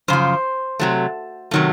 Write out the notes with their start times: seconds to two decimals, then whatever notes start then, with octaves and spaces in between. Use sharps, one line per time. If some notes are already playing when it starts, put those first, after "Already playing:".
0.08 F#2 C#3 F3 C5
0.79 C3 F#3 A3
1.51 C3 D#3 F#3 A3